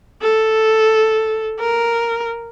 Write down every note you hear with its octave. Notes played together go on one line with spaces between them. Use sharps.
A4
A#4